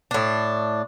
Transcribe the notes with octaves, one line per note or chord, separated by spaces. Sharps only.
A2 D4